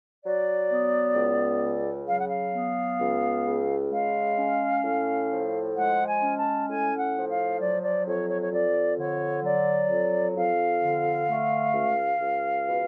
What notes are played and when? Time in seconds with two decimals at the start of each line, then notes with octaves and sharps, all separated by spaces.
0.23 F#3 D5
0.70 B3
1.15 C#2
1.61 C#3
2.08 F#3 F5
2.19 F#5
2.29 F5
2.53 B3
3.00 C#2
3.46 C#3
3.91 G#3 F5
4.39 C#4
4.84 A2
5.31 F3
5.77 G#3 F#5
6.07 G#5
6.22 C#4
6.37 A5
6.68 A2 G#5
6.99 F#5
7.15 F3
7.30 F5
7.60 F#3 D5
7.83 D5
8.06 F2 C#5
8.29 C#5
8.41 C#5
8.52 F2 D5
8.98 D3 C#5
9.44 F#3 D5
9.90 F2
10.36 F2 F5
10.82 D3
11.28 A3
11.74 C#2
12.20 C#2
12.67 B2